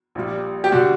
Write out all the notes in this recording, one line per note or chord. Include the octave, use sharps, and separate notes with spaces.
A#1 A#2 G3
G4
D3 G3 F#4